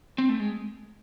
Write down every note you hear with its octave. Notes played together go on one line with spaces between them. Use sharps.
C4
A3
G#3